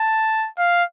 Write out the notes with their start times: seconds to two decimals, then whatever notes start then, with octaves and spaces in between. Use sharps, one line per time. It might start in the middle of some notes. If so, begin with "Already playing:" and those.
Already playing: A5
0.58 F5